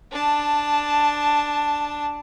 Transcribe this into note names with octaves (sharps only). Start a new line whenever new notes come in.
D4 A5